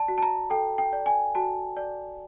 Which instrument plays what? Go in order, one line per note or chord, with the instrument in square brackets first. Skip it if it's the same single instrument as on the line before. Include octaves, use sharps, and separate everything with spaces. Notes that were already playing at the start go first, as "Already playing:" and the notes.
Already playing: [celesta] D5 A5
F#4
A5
A#5
A4 G5
G5
D5
G#5
F#4 A5
D5